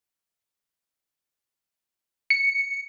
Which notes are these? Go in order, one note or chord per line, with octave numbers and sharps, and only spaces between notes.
C#7